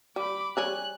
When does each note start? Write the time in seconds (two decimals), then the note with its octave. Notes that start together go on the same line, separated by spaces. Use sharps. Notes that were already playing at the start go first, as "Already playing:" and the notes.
0.16 G3 B5 D6
0.57 G3 G#4 C#5 F#6